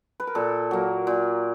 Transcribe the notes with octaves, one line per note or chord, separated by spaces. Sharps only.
B4
A#4
A#2 A4
F#3 A#3
A#2